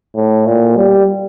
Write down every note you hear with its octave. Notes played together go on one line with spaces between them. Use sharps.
A2
A#2
G3